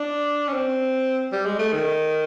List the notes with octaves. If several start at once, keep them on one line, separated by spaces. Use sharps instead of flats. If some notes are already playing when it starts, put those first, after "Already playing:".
Already playing: D4
C#4
C4
G3
G#3
A3
D#3